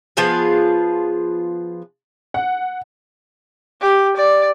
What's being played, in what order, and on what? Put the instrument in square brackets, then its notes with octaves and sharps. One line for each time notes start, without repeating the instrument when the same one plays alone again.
[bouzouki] F3 B3 F4 G#4
[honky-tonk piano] F#5
[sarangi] G4
D5